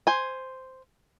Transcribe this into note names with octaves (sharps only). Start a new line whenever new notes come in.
C5 G#5